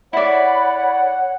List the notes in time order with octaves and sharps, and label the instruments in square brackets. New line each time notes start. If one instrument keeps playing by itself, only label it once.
[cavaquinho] E4 D5 [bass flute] C#5 [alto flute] F#5 [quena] B5